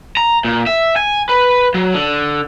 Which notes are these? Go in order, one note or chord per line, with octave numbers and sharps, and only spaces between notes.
A#5
A#2
E5
G#5
B4
F#3
D3